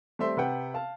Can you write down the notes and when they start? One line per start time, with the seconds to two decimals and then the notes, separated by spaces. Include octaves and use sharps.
0.19 G3 A3 C4 E5 C6
0.37 C3 B4 F#5 G5
0.74 F5 A5